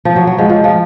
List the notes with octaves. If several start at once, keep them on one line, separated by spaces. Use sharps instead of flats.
F3
F#3
F#3
F3 G#3
F3
F3